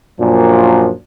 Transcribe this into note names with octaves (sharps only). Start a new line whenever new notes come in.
F#2 A#2 F3 D4